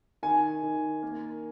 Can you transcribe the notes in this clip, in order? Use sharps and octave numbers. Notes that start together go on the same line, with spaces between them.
D#3 G#5
D#3
A#3